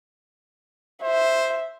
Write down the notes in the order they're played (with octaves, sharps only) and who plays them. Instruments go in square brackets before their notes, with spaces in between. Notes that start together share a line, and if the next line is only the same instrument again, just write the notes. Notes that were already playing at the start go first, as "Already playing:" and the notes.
[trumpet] C5 [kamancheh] E5